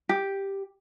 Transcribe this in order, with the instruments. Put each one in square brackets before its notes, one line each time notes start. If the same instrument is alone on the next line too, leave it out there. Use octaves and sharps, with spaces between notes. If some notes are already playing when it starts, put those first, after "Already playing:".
[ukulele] G4